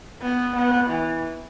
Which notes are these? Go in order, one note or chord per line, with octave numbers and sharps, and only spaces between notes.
B3
B3
E3